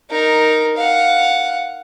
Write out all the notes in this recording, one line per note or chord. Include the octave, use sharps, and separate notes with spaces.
D#4 A#4
F5 F#5